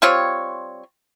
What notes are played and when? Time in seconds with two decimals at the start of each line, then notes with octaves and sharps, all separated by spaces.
0.02 G3 C4 F4 C#5